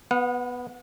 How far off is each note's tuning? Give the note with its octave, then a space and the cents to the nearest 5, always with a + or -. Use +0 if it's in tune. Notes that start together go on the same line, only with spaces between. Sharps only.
B3 +0 F#5 -35